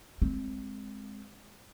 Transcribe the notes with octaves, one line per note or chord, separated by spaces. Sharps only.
G#3 C4